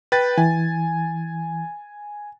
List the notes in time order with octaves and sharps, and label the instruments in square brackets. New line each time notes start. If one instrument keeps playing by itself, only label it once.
[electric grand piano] B4 G5 A6
[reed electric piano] E3 [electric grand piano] G#5